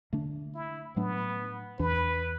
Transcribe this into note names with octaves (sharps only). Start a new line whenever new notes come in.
D3 A3 D4
E4
A2 F#3 A3 B3 D4
E2 E3 D4 B4